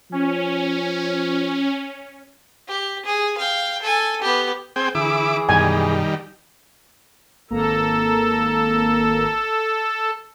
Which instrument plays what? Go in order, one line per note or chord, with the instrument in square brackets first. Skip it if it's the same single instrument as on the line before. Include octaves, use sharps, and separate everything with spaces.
[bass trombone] F3 [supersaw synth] C#4
[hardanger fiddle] G4
G#4
F5 G5
A4 G#5
B3 G4
[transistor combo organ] C4 G#4 G5
[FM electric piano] D3 [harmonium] E3 G#4 [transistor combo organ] E4 D6
[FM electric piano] F#2 B2 [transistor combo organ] D#3 G3 [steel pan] G#5
[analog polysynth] G#1 A#3 A#5 [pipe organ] A4